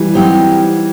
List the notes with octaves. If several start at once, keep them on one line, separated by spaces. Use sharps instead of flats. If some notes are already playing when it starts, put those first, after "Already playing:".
Already playing: E3 G3
F#3 C4 D#4 G4 C5